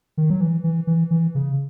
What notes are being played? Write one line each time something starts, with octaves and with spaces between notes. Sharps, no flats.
D#3
F#3
E3
E3
E3
E3
C#3